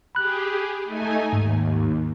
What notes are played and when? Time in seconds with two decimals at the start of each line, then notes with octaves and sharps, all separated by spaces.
0.15 G4 G#4 B5 F#6
0.84 A3 D#4 G#5
1.33 D#2 G#2